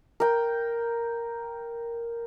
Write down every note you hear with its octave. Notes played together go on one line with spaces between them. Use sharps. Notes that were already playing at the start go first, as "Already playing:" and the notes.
A#4 G5